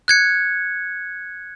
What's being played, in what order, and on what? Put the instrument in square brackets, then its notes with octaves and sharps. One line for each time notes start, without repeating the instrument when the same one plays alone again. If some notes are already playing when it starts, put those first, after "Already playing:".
[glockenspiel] F#6 G#6 C#7